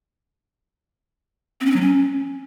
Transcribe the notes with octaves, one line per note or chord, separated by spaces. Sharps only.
C4
C#4
C4
F#3
C#4